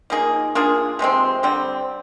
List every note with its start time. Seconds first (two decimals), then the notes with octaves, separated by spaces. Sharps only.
0.10 F3 A#3 D#4 G#4
0.55 A#3 D4 F4 G#4
0.99 C3 F3 G#3 C4
1.43 D3 G3 C4